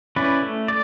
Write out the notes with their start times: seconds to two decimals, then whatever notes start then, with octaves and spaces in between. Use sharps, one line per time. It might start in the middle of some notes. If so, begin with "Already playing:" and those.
0.16 C#4 E4 B4 D5
0.43 A3
0.68 D5